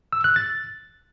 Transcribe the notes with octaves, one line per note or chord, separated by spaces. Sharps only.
E6
F#6
A6